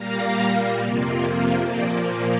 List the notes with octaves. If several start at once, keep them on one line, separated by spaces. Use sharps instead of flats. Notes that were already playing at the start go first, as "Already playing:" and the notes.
Already playing: A#2 G3 A#3 F5 A#5
F2 C3 F3 A#3
A#2 F3 A#3 D5 G5